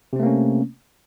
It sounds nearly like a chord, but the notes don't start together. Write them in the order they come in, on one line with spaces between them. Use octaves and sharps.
C3 C4 A3 A#3 C#4